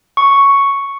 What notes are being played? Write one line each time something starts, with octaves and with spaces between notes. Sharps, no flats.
C#6